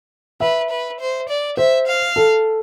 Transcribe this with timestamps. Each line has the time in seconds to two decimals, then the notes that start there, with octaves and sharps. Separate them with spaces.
0.40 B4 E5
0.70 B4
1.00 C5
1.29 D5
1.57 C5 E5
1.87 F5
2.16 A4